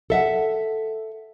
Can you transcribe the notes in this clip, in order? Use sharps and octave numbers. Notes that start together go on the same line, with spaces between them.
A4 E5 F#5